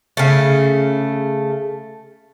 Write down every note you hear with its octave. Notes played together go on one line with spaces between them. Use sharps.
C#3 A3